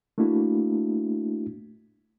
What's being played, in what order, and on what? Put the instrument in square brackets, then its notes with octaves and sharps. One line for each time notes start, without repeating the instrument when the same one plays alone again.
[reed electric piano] A3 A#3 D4 E4 F#4